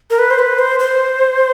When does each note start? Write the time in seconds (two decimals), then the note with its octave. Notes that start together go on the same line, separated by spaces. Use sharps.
0.10 A#4
0.19 B4
0.30 C5
0.39 B4
0.59 C5
0.79 C5